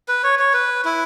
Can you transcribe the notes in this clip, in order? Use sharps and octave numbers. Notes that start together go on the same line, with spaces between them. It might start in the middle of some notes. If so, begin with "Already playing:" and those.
B4
C#5
C#5
B4
E4